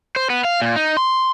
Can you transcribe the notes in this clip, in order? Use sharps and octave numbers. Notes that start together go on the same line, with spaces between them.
C5
B3
F5
A#2
D#4
C6